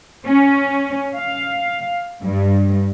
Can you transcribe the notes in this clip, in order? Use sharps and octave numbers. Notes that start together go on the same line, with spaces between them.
C#4
F5
G2